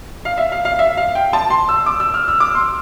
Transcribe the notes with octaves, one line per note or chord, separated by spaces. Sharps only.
F5
E5
F5
F5
E5
F5
G5
A5
C6
E6
D6
E6
F6
E6
D6
C6